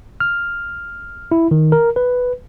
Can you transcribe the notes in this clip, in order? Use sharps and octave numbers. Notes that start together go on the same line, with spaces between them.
F6
E4
D#3
A#4
B4